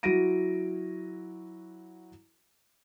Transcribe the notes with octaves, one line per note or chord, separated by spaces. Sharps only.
F#3 E4 F#4 A#6 D7 D#7